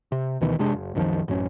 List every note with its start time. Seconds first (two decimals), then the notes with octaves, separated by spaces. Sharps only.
0.12 C3
0.41 D2 B2 D#3 E3
0.59 F1 C3 G#3 D4
0.73 F#1
0.95 C2 F#2 D#3 F3
1.28 A1 F#2 C#4